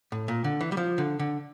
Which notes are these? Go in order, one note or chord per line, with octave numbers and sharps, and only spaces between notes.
A2
A#2
D3
E3
G3
F3
D3
D3